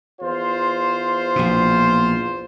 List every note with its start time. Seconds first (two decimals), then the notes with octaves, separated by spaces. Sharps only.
0.21 E2 F4 C5
1.36 A#1 B2